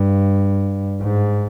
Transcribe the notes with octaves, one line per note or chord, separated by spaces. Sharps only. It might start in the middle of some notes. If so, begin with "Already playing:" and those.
Already playing: G2
G#2